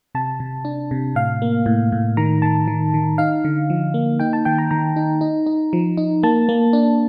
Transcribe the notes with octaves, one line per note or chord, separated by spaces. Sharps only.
C3 A5
C3
D4
C3
A2 F5
A#3
A2
A2
D#3 A#5
D#3 A5
D#3
D#3
D#4 F5
D3
F3
A#3
D#4 G5
A5
D#3 G5
A#5
D#3 A#5
D#4
D#4
D#4
F3
D#4
A#3 A5
A#3
D4